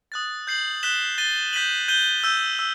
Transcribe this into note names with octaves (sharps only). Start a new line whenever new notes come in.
D#6 F#6 A6
G6 C7 F#7
F#6 B6 E7 G7
A6 D#7 G7
G6 B6 D#7 F#7
G6 D#7 G7
E6 G6 D#7
E6